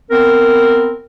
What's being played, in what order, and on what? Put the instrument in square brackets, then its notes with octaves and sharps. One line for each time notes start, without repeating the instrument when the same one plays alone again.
[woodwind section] B3 C4 A#4